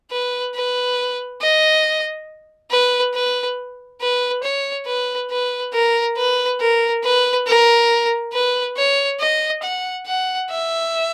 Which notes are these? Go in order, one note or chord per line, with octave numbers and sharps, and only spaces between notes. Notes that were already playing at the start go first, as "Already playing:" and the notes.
B4
B4
D#5
B4
B4
B4
C#5
B4
B4
A#4
B4
A#4
B4
A#4
B4
C#5
D#5
F#5
F#5
E5